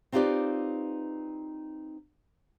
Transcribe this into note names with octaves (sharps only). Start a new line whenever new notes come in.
C4 D#4 F4 G4 B4 D5